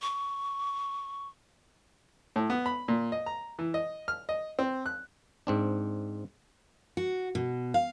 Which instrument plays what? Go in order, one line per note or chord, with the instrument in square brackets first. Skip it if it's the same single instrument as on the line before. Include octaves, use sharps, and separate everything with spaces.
[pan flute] C#6
[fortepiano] A2
B3
B5
A#2
D#5
A#5
E3
D#5
F6
D#5
C4
F#6
[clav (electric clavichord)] G#2 C4 D4
[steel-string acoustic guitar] F#4
B2
F5